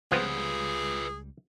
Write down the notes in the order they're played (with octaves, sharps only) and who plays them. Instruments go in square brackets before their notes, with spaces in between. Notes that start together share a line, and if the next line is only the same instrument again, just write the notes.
[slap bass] C#2 G3 [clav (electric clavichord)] F3 B3 C4 [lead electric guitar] F4 B4 [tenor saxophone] G#4